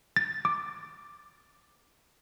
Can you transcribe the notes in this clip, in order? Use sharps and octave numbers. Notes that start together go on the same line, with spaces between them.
A6
D6